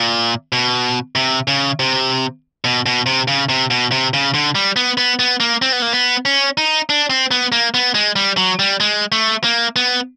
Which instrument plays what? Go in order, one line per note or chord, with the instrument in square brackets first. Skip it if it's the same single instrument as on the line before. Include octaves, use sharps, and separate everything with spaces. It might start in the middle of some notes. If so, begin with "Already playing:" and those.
Already playing: [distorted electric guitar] A#2
B2
C3
C#3
C3
B2
B2
C3
C#3
C3
B2
C3
C#3
D3
G3
B3
B3
B3
A#3
C4
B3
A#3
B3
C#4
D#4
D4
C4
B3
A#3
B3
G#3
G3
F#3
G3
G#3
A3
A#3
B3